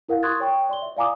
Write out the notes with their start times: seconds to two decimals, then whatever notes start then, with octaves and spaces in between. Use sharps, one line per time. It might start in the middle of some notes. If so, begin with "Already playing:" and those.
0.09 E4 A#4 F5 F#5
0.23 C6 C#6 D#6 F#6 G#6 A6
0.40 C#5 G5 C#6
0.69 D5 C6 G7
0.82 E5
0.97 D5 F5 G#5 A#5 D6 D#6